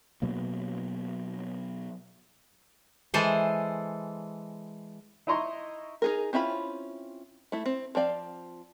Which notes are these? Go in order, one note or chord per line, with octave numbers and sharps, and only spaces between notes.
B2 F#3 A#3
E3 G#3 A4 C5
D#4 E4 D#5 A#5 C6 C#6
D#4 G#4 A#4
C4 C#4 E4 F4 B5
A3 E4
C4
F3 C4 D5 F5